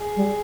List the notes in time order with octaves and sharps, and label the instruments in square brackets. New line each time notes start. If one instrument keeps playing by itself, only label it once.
[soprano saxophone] G#4
[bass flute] G3